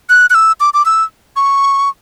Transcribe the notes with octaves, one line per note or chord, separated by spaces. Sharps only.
F#6
F#6
E6
D6
D6
E6
C#6